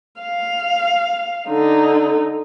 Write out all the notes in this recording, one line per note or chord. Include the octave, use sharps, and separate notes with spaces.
F5
D3 D#4